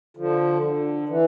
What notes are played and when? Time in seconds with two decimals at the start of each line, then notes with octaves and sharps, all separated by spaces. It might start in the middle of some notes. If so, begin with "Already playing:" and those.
0.17 D3 F3
0.63 D3
1.09 E3